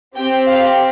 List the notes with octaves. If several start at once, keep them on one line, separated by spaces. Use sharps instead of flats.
C4 G4 G5
F5